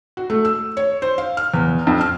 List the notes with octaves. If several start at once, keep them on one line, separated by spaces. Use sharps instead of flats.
F#4
A3
E6
C#5
C5
F5
F6
E2
F2
F6